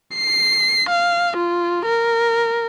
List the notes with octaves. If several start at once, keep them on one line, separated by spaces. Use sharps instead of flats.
C7
F5
F4
A#4